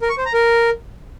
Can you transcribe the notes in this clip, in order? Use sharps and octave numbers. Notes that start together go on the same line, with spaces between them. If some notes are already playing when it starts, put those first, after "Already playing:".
A#4
C#6
C5
A#5
A#4